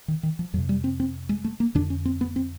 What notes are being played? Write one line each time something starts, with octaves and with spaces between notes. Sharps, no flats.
D#3
D#3
F3
F2 C3 F#3
G3
C4
C4
G#3
A3
A#3
F2 D3 D4
C#4
C4
B3
C4